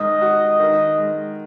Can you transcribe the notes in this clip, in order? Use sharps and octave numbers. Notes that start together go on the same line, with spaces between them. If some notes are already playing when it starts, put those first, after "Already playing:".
Already playing: G#2 D#3 D#5
F#4
D#3
G#3